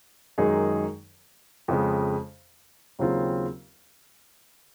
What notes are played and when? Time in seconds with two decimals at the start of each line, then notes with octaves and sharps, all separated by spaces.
0.38 F#2 D#3 G#3 D#4 G#4
1.68 F2 C#3 G#3
2.99 D#2 C#3 F#3 C4 F4